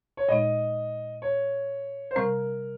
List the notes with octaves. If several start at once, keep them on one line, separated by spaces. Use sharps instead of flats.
C#5
A#2 G#3 D#4 D#5
C#5
C5
C3 G3 C4 A#4